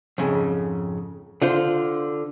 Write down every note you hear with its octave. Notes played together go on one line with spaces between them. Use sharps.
F2 G#2 C#3
D3 F4 C5